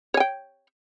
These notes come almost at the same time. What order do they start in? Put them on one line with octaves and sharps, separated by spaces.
C#5 G#5 G5